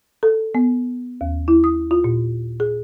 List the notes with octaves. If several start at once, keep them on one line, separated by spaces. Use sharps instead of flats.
A4
B3
D#2
E4
D#6
F4
A#2
G#4